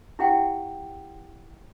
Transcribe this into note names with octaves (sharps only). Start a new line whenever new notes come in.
E4 G4 F#5 G5